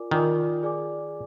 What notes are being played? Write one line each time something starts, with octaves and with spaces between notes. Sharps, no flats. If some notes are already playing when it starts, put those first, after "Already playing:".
Already playing: F4 A#4 D5 G#5 D6
D#3 F4 A#4 D5 G#5 D6
G#4 D5 G#5 D6